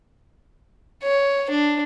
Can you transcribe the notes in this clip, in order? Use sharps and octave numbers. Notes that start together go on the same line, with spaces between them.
C#5
D4